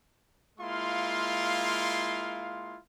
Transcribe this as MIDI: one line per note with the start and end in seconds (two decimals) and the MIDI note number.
0.59 2.78 56
0.59 2.78 58
0.59 2.78 64
0.59 2.78 65
0.59 2.78 77
0.59 2.78 84